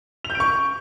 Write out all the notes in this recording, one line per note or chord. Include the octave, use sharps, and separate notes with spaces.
F7
G6
D7
C#6